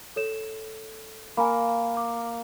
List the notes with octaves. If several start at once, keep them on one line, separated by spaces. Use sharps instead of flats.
A4 C#5 E7
A#3 A#4 G#5 B5
D6